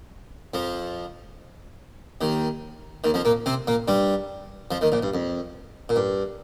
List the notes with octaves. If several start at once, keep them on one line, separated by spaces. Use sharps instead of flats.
F2 F3
D#2 D#3
D#2 D#3
F2 F3
A#2 A#3
C3 C4
A#2 A#3
G2 G3
F2 F3
D#2 D#3
A#1 A#2
G2
F2
A#2
G2